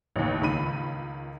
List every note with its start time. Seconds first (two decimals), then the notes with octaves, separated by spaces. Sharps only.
0.16 A1 D#2
0.41 C#2 D#3 B5 D#7